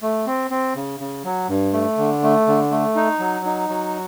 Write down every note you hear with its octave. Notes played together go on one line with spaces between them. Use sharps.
A3
C4
C4
C#3
C#3
F#3
G2
A3
D3
A3
D3
A3
D#4
F#3
D#4
F#3